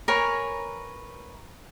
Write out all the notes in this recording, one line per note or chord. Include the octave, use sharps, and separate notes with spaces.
A#4 B4 C#5 G#5